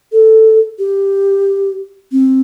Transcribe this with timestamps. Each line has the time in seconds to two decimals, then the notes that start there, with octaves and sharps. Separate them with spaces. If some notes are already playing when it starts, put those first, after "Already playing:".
0.12 A4
0.79 G4
2.12 C4